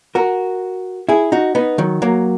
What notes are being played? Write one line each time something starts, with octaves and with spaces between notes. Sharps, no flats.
F#4 A#4
E4 G#4
D#4 F#4
B3 D#4
D#3 F#3
F#3 A#3